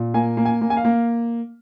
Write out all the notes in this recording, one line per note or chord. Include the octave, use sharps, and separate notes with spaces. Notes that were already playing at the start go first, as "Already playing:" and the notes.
Already playing: A#2
A#3 G#5
A#3
G#5
A#3
G#5
F5
A#3